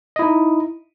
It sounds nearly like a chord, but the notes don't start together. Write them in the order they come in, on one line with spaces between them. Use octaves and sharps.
D#5 E4 D#4